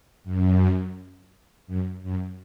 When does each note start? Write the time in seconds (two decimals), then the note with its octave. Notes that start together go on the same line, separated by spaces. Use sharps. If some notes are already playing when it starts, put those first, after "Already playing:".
0.24 F#2
1.67 F#2
2.03 F#2